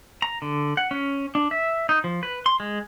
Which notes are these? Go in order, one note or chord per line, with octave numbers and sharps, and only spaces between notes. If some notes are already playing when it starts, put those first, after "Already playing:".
A#5
D3
F#5
C#4
D4
E5
D#4
F3
B4
C6
G#3